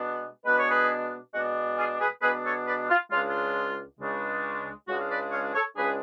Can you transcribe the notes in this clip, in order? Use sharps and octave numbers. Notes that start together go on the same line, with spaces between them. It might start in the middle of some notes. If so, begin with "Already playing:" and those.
Already playing: B2 G#3 B3 D4
B2 G#3 B3 D4 B4
C#5
G#4 B4
B2 G#3 B3 D4 F#4
F4 G#4
G#4 B4
B2 G#3 B3 D4 G#4 B4
A4 C#5
B4 D5
F4
C#2 C#3 G#3 D4 F4
F4
C#2 C#3 G#3 D4
C#2 C#3 G#3 D4 F#4
F5
B4 D5
C#5 F5
A4 C#5
C#2 C#3 G#3 D4 G#4 B4